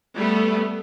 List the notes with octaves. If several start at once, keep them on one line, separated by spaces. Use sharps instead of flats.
G3 A3 B3